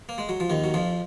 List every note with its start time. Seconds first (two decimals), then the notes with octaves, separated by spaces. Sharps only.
0.09 A#3
0.18 G#3
0.29 F#3
0.40 F3
0.50 D#2 D#3
0.64 F#3
0.74 F2 F3